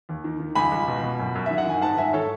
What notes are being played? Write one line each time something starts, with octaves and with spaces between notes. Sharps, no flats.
D#2
D#3
D#3
C#2 G#5 B5
C#2
B2
B2
F#2
F#2
D#3 E5
F#5
D#3 G#5
G#2 F#5 A5
G#2 E5 G#5
D#3 A4 C#5